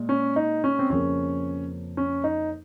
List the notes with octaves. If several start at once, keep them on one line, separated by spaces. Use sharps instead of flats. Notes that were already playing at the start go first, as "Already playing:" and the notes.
Already playing: A#2 G#3
C#4
D#4
C#4
C4
F2 C#3 F3 A#3 C#4
C#4
D#4